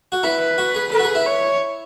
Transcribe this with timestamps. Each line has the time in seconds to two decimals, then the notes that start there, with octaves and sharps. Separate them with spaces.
0.12 F#4
0.23 E4 B4
0.58 F#4
0.74 G#4
0.92 A4 B4
0.99 F#4
1.03 G#4
1.15 E4
1.26 C#5